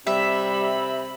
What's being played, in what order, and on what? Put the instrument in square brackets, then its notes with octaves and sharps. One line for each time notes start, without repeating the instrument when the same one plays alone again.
[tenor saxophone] C3 [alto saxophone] G3 [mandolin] E5 [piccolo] B5